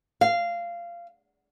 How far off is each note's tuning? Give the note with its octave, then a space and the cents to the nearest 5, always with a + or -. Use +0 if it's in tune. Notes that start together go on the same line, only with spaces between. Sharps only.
F5 -15